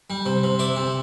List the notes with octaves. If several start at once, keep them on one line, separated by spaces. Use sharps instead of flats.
G3
C3
C3
E4 D5
C3